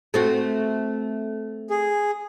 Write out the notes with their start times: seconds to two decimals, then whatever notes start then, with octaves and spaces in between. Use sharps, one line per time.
0.14 A3 C4 F#4
1.70 G#4